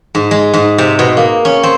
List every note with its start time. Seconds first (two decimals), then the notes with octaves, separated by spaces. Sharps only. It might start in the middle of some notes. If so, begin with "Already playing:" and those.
0.15 G#2
0.31 G#3
0.54 G#2
0.78 C3
0.99 B2
1.17 A#3
1.45 C#4
1.63 C4